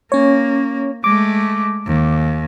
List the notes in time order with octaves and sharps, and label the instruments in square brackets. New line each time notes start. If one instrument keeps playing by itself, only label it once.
[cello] A#3 [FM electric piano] C#4 C#5
[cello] G#3 A3 [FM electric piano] D6
[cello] D#2